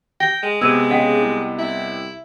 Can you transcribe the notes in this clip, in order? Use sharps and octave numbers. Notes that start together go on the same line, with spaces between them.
G5 A#6 G7
G#3
C3 G#3 B3 E6 G#6 D#7
C#3 D#5 F#5 G5
C2
C2 E4